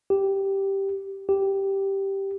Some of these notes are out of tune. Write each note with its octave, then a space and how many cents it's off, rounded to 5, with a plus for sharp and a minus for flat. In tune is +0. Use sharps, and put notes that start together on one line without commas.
G4 -5
G4 -5